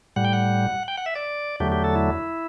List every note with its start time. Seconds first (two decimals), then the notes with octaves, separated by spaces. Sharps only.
0.16 A2 G3 F#5
0.25 G5
0.33 F#5
0.88 G5
0.97 F#5
1.06 E5
1.15 D5
1.60 E2 D3 F#3 A3 G4
1.72 G4
1.84 A4
1.96 E4